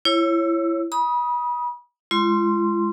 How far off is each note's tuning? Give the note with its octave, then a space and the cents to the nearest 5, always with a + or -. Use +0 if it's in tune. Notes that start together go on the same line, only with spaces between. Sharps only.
E4 +25 C#5 -15 E6 +0
B5 -35 D#6 +10
G#3 +0 F4 -45 C6 +0